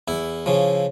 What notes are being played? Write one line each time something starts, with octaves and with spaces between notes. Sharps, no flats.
E2 E4
C#3 F3